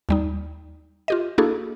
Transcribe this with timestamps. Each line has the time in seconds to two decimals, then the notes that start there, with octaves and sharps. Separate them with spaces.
0.09 D#2 G3 D#4
1.08 F4 G4 D#5
1.38 A#3 D4 E4 F#4 G#4 A4